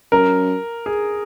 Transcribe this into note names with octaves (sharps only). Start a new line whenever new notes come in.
F#2 A#4
G#4